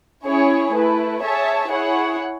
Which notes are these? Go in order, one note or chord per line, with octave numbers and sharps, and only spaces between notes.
C#4 E4 G#4 C#5
A3 E4 B4
G#4 C#5 E5 A5
E4 G#4 C#5 F#5